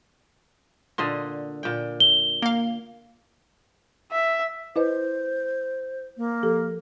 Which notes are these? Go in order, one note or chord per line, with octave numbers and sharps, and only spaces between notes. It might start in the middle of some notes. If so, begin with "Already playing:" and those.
A#2 D3 D#5 C6
A#2 G5
G7
A#3 F5
E5
E4 B4 C5 D#5
A#3
F3 G4 A4